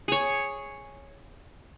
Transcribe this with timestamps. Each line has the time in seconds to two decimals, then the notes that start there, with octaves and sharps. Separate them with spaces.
0.08 G#4 C#5